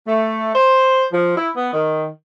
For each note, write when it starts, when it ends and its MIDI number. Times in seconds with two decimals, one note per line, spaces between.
0.08 0.51 57
0.55 1.04 72
1.13 1.33 53
1.37 1.49 64
1.57 1.69 59
1.74 2.09 51